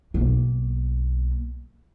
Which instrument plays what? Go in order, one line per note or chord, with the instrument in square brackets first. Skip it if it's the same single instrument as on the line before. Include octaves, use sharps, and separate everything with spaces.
[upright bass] B1 A#3